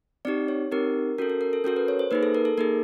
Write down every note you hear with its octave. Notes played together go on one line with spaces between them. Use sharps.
C4 D#4 G4 D5
C#5
C4 D#4 G4 A#4
C#4 F#4 A4 A#4
A4
A#4
A4
C#4 F#4 A4 A#4
B4
C#5
C5
A#3 D#4 G#4 B4
A4
A#4
A4
A#3 D#4 G#4 A#4